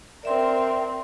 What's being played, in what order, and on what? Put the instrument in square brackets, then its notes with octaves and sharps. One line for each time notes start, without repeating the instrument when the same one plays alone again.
[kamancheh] C4 A#4 [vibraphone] D5 E5 C6